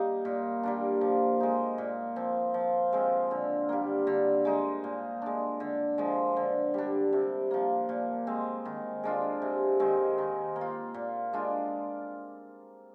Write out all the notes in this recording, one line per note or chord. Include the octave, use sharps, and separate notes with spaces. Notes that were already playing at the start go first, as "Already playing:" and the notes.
Already playing: G3 A#3 D#4
A#2
G3 A#3 D4
F3
G#3 D#4
A#2
F3 C4
F3
G#3 C4 F4
D3
G3 A#3
D3
G#3 D#4
A#2
G#3 D4
D3
F3 G#3
D3
G3 D4
C3
F3 A#3
A#2
G#3 C4
D#3
G#3 D4 F4
C3
D#3 G#3 C4
D#3
A#3
F4
A#2
G#3 D4 F4